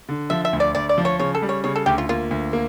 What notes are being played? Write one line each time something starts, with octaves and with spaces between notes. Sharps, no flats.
D3
F3 E5
E5
D2
D5
D2 D5
D5
F3
C#5
C#3 C#5
A4
G3
C#5
C#3 C#5
A4
D2 G4
F4
A#3 F4
D2
A#3